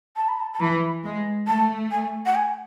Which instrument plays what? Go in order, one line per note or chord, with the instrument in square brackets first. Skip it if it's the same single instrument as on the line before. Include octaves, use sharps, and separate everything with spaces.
[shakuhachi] A5
B5
A5
A5
[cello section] E3 [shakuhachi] B5
[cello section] G#3
[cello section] A3 [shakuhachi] A5
[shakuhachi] G#5
F#5
G#5